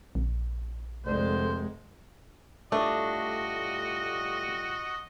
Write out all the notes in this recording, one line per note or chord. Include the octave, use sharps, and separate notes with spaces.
A#1
F1 D3 G#3 C5
A2 G3 A3 D4 F4 F#4 D#5